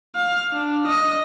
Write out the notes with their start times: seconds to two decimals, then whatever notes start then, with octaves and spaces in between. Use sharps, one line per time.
0.16 F5
0.53 D4
0.87 D#5